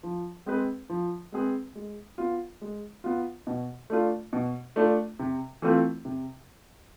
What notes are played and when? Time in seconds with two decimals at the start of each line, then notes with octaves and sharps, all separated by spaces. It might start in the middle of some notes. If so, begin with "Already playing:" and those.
0.03 F3
0.46 G#3 C4 G#4 B4
0.89 F3
1.32 G#3 C4 G#4 B4
1.75 G#3
2.18 B3 F4
2.61 G#3
3.04 B3 F4
3.47 B2
3.90 A3 D4 F4
4.33 B2
4.76 A3 D4 F4
5.19 C3
5.62 E3 A3 C4 F4
6.05 C3